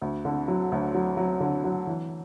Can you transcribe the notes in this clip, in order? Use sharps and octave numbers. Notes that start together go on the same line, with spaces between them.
D2
D3
F#3
D2
F#3
F#3
D3
F#3
E3